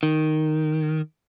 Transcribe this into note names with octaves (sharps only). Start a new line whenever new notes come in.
D#3